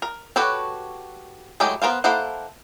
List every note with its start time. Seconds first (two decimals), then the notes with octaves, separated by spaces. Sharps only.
0.02 A#4
0.36 F#4 G4 A4 B4 C#5
1.60 F#3 G#3 A3 E4 G4
1.82 B3 A#4 C5 F5
2.04 A#3 E4 A4 C5 F#5